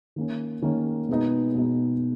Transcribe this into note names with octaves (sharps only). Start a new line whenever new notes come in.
D#3 A#3 C#4
D#3 A#3 C#4
B2 G#3 B3 D#4
B2 G#3 B3 D#4